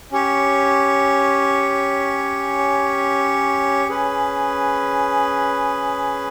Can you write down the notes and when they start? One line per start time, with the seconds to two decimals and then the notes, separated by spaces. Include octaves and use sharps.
0.12 C#4 G4 C#5
3.88 C#4 G#4 B4